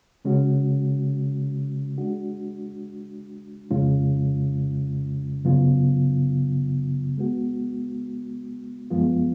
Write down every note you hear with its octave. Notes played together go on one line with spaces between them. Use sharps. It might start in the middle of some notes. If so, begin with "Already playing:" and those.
C#3 G#3 C#4 F#4
G#3 D4 F#4
F2 C#3 G#3 C#4 F4
F#2 C#3 F#3 B3 F4
G#3 B3 F#4
F#2 F3 G#3 B3 F4